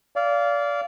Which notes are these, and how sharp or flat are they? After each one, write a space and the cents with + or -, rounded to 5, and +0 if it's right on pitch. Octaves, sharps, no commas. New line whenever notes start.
D5 -25 F5 -10